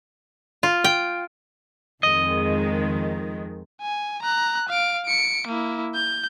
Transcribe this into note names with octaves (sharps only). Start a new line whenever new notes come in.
F4
G5
F2 D#3 G#3 D#5
G#5
A#5 F#6
F5 D7
C#7 D7
A#3 E4
G6